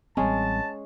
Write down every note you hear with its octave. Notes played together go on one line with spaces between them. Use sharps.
A1 G3 G#3 C4 C#4 A5